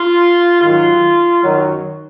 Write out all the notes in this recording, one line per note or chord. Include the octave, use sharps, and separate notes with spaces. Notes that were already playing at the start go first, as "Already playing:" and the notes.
Already playing: F4
G#2 D#3 F#3 F4
F#2 D#3 F#3